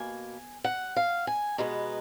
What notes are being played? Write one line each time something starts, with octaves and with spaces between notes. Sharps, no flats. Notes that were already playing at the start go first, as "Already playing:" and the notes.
Already playing: B2 A#3 G#5
F#5
F5
G#5
B2 G#3 B3 A#5